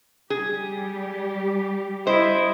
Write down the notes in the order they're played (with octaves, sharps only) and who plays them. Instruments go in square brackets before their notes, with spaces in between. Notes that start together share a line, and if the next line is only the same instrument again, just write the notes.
[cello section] G3 G4 [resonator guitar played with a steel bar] G#4
[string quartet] E4 [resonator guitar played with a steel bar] C5 [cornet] D#5